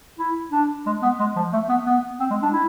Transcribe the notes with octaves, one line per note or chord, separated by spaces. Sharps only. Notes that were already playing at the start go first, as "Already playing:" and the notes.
E4
D4
G#3
B3
G#3
F3
A3
B3
B3
C4
G#3
D4
E4